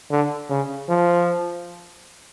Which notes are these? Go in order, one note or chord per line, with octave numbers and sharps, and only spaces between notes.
D3
C#3
F3